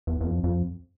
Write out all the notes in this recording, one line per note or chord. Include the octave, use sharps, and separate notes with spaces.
E2
E2
F2
F2